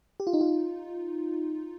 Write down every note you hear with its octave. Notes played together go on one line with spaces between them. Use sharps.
G4
F4
D#4
F4